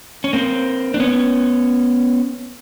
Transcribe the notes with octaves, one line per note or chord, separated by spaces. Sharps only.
C#4
A#3 C4
D4
B3 C#4